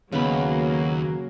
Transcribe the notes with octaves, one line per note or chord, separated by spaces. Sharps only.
D#2 C#3 F#3 A#3 B3 B5